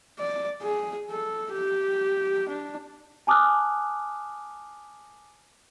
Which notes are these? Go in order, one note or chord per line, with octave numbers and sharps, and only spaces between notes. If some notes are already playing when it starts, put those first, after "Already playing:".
D5
G#4
A4
G4
D4
G#5 A5 D6 D#6 F6 F#6